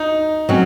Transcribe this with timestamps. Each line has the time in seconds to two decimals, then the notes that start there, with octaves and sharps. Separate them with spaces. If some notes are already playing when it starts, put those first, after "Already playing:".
Already playing: D#4
0.49 F#3 C4 C#4